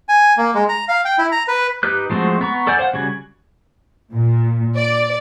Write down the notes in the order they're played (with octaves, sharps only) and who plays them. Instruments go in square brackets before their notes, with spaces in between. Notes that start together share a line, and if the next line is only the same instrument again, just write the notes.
[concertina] G#5
A#3
G#3
A#5
F5
G5
E4
A#5
B4
[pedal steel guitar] D#4 G4 B4 F#6
F3 G#3 A3 C4 F#4
B3 A#5 C#6
A4 D5 F#5 G#5 G6
C5 F5 F#5
C#3 G3 F#4 G#5
[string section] A#2
D5